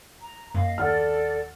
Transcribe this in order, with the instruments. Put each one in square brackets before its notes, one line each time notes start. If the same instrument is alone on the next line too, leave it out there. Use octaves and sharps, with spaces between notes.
[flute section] A#5
[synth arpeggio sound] F#2 [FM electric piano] A#3 [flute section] D#5 F5
[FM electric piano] D#2 [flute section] A4 D5 [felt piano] F#5 F6